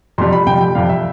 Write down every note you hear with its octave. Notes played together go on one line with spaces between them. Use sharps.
F2 C3 G3 C6
B5
F2 C3 G3 G5
G5
F2 C3 G3 F5
E5